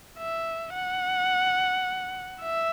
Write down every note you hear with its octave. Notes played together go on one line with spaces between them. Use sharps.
E5
F#5
E5